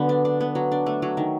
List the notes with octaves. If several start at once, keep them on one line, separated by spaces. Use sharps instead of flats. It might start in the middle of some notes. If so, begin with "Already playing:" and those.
Already playing: D3 F#3 B3
D4
D4
B3
F#3
D4
A3
F#3
D#3